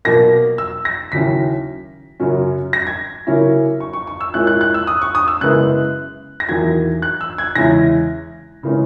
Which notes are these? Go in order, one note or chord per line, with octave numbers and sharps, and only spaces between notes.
B2 F#3 A#3 A#6
E6
A#6
D#2 C#3 F#3 C#4 E4 B6
F#2 C#3 F#3 C#4
A#6
G#6
C#3 F#3 A#3 C#4 E4
C#6
C#6
C#6
E6
A#2 G#3 C#4 E4 F#6
F#6
F#6
E6
D#6
C#6
D#6
E6
F#2 C#3 G#3 B3 E4 F#6
A#6
E2 D#3 F#3 A#3 G#6
F#6
E6
G#6
E2 C#3 G#3 C#4 E4 A#6
C#3 E3 G#3 C#4